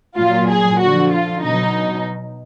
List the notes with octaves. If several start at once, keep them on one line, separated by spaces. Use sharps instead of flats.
A#2 F#3 F4
G#4
D3 F3 F#4
F4
B2 F#3 D#4